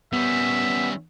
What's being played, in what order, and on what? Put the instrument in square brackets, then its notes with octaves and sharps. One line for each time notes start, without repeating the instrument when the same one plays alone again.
[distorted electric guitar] G3 C#4 [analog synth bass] B3 [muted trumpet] E5